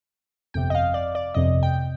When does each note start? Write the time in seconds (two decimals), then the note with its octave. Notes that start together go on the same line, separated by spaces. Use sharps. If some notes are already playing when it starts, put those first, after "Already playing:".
0.54 G1 F2 C3 G5
0.70 D#5
0.75 F5
0.94 D5
1.15 D5
1.34 G1 F2 C3 D#5
1.63 G5